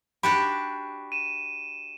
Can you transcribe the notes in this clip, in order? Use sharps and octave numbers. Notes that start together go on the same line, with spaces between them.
D4 F#4 G4 B5
D#7 E7